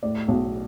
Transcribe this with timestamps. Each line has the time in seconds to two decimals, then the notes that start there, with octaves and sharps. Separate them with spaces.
0.03 A2 D5
0.28 B1